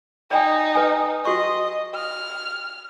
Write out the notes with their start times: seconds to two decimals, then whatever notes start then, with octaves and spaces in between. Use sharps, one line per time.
0.31 D#4 D5 G5 G#5
0.75 B4 G#5
1.25 F#4 D#5 C6 C#6
1.95 F6